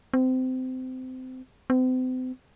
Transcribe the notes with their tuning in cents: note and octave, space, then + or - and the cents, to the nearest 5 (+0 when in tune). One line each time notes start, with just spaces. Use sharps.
C4 -25
C4 -40